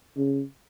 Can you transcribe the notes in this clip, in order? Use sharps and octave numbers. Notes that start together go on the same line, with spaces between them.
C#3